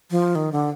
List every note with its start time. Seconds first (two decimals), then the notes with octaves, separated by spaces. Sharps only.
0.11 F3
0.35 D#3
0.52 D3